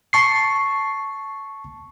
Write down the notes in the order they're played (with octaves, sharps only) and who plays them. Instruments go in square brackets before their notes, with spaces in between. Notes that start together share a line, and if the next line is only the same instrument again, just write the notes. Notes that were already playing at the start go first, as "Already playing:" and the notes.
[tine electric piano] A5 C#6 C7